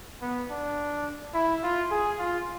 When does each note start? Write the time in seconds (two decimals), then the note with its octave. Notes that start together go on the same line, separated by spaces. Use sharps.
0.22 B3
0.50 D4
1.34 E4
1.63 F4
1.91 G#4
2.18 F4